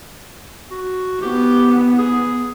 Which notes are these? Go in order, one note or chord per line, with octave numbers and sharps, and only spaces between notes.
F#4
B3 G4
G#4